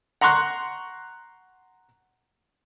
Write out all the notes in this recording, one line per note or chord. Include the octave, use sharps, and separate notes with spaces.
F#5 A#5 C6 C#6 F#6